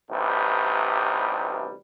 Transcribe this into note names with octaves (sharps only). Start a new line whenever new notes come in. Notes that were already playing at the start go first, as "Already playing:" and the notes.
A1 D2 C3 G3 D#4 B4